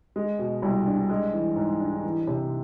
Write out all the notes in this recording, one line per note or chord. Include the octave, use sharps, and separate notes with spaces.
G#3
B2
C2
D4
G#3
E3
G#2
D4
E3
C3